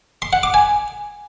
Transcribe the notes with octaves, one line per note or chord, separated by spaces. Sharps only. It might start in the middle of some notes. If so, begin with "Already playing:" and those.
C6
F#5
D6
G#5